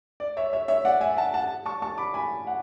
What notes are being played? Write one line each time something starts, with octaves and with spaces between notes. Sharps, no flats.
D5
C#5 E5
C#5 E5
C#5 E5
D5 F#5
E5 G#5
F#5 A5
F#5 A5
A5 C#6
A5 C#6
B5 D6
G#5 B5
F#5